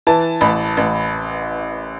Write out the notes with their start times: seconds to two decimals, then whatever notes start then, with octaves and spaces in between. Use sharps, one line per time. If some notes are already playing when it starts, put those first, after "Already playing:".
0.07 E3 A5
0.41 A1 B5
0.77 A1